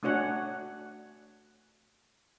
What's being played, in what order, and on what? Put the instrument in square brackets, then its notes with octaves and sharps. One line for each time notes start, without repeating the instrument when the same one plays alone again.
[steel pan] A3 D4 F#4 C#5 F#5 G#5